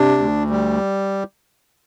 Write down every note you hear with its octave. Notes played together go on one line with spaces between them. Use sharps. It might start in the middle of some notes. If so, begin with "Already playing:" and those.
Already playing: C3 D4
D2
G3